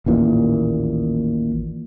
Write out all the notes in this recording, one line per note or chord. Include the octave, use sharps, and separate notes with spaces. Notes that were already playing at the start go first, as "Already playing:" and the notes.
A1 D#2 A#2 E3